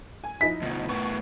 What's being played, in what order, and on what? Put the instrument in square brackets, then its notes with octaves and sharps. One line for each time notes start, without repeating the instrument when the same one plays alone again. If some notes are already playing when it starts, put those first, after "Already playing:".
[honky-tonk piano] G#5
[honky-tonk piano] F3 D#4 E4 [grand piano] B6
[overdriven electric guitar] D2 B2
[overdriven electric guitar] A2 B3 [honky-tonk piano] C#6